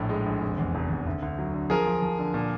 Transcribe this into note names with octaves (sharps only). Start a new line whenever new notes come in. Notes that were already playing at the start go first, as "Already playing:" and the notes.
Already playing: A#1 A2
G#3
A#1
F1
E2
F1
E2
D2
D2
F#3
D3
F3 G#4 A#4
F3
F3
D3
A#2